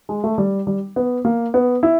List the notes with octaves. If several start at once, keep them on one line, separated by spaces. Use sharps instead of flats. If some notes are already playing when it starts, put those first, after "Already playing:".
G#3
A3
G3
G3
B3
A#3
B3
E4